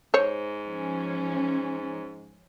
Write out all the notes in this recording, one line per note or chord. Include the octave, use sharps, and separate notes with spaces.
G#2 C5 C#5
F3 C#4